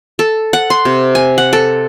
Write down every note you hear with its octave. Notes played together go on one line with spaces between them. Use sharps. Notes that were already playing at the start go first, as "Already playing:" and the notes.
A4
F#5
C6
C3
G#5
F#5
A4